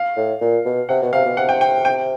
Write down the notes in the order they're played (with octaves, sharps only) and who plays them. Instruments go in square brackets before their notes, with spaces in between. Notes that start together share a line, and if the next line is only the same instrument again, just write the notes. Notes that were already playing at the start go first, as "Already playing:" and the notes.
Already playing: [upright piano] F5
[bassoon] A2
A#2
B2
[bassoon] C3 [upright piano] F#5
[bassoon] B2
[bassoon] C3 [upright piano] F5
[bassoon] B2
[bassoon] C3 [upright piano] F#5
[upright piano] G5
G5
G5